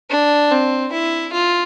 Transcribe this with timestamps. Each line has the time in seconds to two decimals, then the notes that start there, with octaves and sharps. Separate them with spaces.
0.10 D4
0.51 C4
0.92 E4
1.33 F4